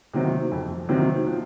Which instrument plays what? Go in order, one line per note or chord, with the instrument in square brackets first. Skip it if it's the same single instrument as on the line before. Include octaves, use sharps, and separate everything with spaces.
[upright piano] C3 D#3 F#3 C4
F2
C3 D#3 F#3 C4
F3